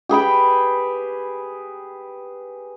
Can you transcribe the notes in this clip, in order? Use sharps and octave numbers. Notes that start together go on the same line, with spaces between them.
G4 G#4 B4 G5